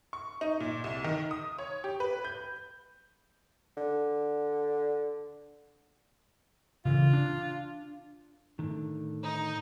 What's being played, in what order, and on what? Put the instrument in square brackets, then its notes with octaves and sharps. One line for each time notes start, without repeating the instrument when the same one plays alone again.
[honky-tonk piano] C#6
D#4
A#2
C2
D#3
D#6
C#5
G4
B4
G6
[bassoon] D3
[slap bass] C#3 E3 [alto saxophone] F4
[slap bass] D4
[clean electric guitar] A2 D3 D#3
[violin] D#4